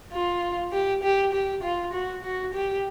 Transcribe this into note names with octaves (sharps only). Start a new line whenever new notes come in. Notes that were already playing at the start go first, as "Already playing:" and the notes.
F4
G4
G4
G4
F4
F#4
F#4
G4